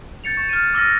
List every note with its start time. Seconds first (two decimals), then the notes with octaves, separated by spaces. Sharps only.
0.24 G6 A6 C#7 F7
0.37 C#6
0.49 F6 A6 D#7
0.74 D6 E6 F6 A6 A#6 D#7